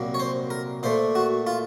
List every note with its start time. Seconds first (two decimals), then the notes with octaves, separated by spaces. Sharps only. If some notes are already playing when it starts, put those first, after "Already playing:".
Already playing: C2 A#2 F#3 A#3
0.14 C#5
0.19 C5
0.50 A#4
0.83 A#2 A3 C5
1.15 F#4
1.47 F4